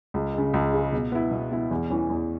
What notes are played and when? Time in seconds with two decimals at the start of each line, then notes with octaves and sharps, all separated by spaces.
0.14 C#2
0.34 C#3 G#3
0.54 C#2
0.73 C#3 G#3
0.92 B2
1.12 B3 E4
1.31 B2
1.51 B3 E4
1.71 E2
1.90 E3 C#4
2.10 E2